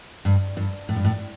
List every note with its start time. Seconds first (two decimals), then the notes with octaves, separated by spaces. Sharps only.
0.25 G2
0.57 G2
0.89 A2
0.96 G2
1.05 A2